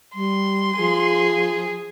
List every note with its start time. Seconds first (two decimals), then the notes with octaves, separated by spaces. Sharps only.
0.15 G3 C6
0.78 F3 G#4